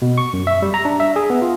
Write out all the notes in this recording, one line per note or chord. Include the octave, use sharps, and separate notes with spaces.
B2
C#6
F#2
E5
G3
A#5
D4
E5
G#4
B3
F4